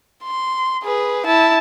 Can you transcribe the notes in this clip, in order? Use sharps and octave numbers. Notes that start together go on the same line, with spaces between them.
C6
G#4 B4
E4 A5